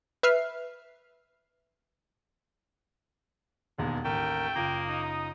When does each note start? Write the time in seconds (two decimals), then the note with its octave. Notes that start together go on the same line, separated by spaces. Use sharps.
0.23 B4 E5 F6 C7
3.78 E1 D#2 G#3 B3
4.05 A1 D#2 A3 A#4 G5
4.56 F#1 A#3 F4 D#6
4.88 D#4